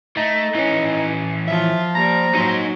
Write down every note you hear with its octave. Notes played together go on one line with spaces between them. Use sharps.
A3 D#4
E3 C#4
F3 F4 E5
G3 A#3 A#5
F#3 D#4 C5